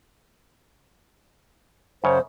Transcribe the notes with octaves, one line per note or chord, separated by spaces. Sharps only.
F#2 C#3 C5 C#5